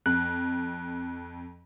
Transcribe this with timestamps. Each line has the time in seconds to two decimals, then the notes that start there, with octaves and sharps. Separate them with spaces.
0.06 F2 F#6